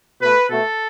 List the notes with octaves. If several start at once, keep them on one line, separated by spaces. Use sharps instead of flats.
B2 A3 B4
B2 A3 A4